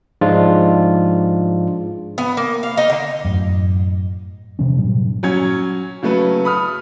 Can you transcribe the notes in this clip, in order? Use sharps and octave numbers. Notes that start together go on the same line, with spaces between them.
G#2 F3 G#3 D4 F4
B3
A#3
F5
D#4
D3
F#2 A2
C3 F3 C#4
G2 A#2 F#3
F#3 C#4 G#6
C#3 F#3 A3 B4
B5 D#6 F6